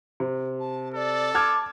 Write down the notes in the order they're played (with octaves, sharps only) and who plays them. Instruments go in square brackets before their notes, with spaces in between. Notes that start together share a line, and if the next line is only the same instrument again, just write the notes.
[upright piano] C3
[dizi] A5
[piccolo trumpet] A4 [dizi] D5
[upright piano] A5 F6 G#6 [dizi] D6